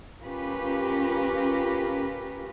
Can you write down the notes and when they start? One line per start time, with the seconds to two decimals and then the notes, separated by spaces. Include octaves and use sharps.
0.24 C#4 F4 G4 A#4 B4